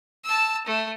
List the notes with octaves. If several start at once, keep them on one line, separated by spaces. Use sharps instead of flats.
A5 E6
A3